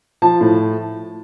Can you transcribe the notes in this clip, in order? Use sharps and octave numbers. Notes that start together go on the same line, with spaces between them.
F3 A5
A2